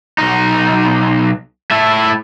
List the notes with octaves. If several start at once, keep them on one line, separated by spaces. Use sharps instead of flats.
B1 D#4
A3 E4